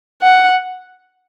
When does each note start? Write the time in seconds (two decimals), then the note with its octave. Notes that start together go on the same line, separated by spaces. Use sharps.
0.22 F#5